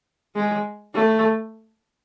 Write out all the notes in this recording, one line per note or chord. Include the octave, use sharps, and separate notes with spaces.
G#3
A3